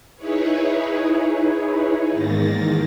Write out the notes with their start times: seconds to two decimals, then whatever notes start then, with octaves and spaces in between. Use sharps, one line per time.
0.16 D#4 E4 G#4 B4 C#5
2.10 E2 G#2 D#3 A#3 A6 A#6